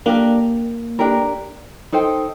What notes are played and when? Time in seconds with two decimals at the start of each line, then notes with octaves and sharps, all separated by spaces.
0.06 A#3 D4 G4 A#4
0.99 D4 G4 A#4
1.92 D#4 A4 C5 G5